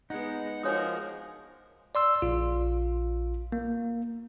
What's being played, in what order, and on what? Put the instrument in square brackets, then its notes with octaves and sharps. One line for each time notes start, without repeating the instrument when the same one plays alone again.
[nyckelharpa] G#3 B3 [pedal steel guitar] D#4 [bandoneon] F#5
[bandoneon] F3 G#3 [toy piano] D4 C#5 D#6 [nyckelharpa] F#4 A#4
[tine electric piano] D5 C6 E6
A#1 F4
A#3